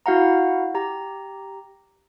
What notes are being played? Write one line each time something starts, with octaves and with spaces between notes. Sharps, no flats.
E4 F#4 F5 F#5 A#5
G4 A#5